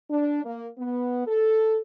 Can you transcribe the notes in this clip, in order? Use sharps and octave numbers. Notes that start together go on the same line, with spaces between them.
D4
A#3
B3
A4